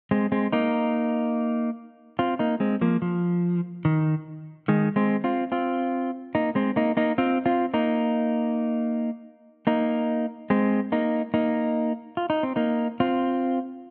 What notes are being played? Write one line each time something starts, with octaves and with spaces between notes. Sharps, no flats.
G#3 C4
G#3 C4
A#3 D#4
C4 F4
A#3 D#4
G#3 C4
F3 A#3
F3
D#3
D#3 G#3
G#3 C4
C4 F4
C4 F4
A#3 D#4
G#3 C4
A#3 D#4
A#3 D#4
C4 F4
C4 F4
A#3 D#4
A#3 D#4
G#3 C4
A#3 D#4
A#3 D#4
F4
D#4
C4
A#3 D#4
C4 F4